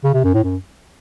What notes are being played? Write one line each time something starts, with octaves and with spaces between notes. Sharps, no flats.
C#3
C3
F#2
A2
F#2